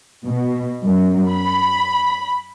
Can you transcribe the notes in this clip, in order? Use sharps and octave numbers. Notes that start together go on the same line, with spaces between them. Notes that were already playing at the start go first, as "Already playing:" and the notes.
B2
F#2
B5